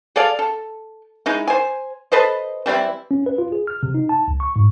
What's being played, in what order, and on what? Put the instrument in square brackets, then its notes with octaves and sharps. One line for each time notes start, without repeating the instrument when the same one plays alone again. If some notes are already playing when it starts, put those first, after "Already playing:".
[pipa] G#4 A4 D5 F5
A4
G#3 D#4 E4
C5 G#5
A4 B4 C5 D#5
E3 G3 C4 E4
[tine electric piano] C#4
B4
F4
G#4
F6
C3
D#4
A5
C#2
C#6
G#2